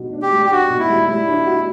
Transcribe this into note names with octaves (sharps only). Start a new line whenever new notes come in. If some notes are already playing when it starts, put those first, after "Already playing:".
Already playing: B2 G3 D4
D4
G4
G3
G4
D4 F#4
B2
E4
G3
G3 E4
D4
F#4